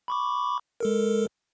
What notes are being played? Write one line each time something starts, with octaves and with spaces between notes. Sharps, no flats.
B5 C#6 D6
G#3 A4 A#4